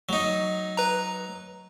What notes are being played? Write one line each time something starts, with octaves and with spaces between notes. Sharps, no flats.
F#3 D#4
B4 A#5